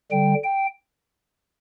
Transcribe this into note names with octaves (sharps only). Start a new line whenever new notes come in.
D3 G3 G5
G5